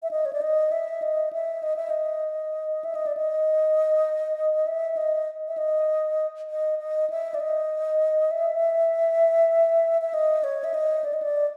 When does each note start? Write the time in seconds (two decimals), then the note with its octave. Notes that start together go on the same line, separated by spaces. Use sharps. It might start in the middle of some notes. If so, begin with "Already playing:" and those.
0.03 E5
0.11 D#5
0.25 C#5
0.33 D5
0.41 D#5
0.72 E5
1.02 D#5
1.33 E5
1.63 D#5
1.76 E5
1.90 D#5
2.84 E5
2.95 D#5
3.06 D5
3.17 D#5
4.67 E5
4.97 D#5
5.48 E5
5.57 D#5
6.49 D#5
6.79 D#5
7.10 E5
7.34 D5
7.40 D#5
8.31 E5
10.01 E5
10.14 D#5
10.44 C#5
10.64 E5
10.74 D#5
11.04 D5
11.13 D#5
11.22 D5